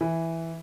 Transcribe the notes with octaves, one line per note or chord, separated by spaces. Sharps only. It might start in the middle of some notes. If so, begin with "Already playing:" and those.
E3